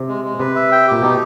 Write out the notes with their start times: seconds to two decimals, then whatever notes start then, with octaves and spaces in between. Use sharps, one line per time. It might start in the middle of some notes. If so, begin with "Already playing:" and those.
Already playing: C3
0.08 G#3
0.25 G#3
0.39 C3 B4
0.55 E5
0.72 G5
0.88 A#2 G4
1.02 B2 D#4